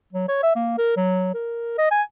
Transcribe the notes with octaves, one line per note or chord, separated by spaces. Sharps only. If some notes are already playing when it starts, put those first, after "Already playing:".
F#3
C#5
E5
A#3
A#4
F#3
A#4
D#5
G#5